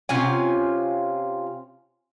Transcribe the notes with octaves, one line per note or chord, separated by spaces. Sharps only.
C3 C#4 F4 G#5